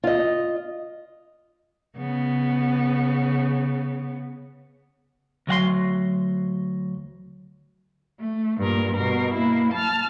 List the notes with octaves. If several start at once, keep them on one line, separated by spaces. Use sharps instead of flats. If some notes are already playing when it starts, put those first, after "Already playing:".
F4 D#5
C#3 B3
D2 F#3 F#5 C6
A3
G2 A#2 A#4
B2 A#4
A#3 E4
A5 F6